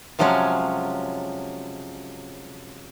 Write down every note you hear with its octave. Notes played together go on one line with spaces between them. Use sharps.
C3 F3 F#3 G#3 C#4